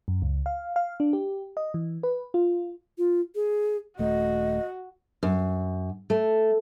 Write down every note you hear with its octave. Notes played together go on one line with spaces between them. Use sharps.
F#2
C#2
F5
F5
D4
G4
D#5
E3
B4
F4
F4
G#4
D#1 A3 F#4 D#5
F#2
A3